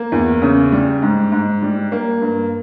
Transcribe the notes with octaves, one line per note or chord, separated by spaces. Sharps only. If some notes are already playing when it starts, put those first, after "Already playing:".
Already playing: A#3
E2
C#3
G3
G#2
G#2
G3
A#3
G2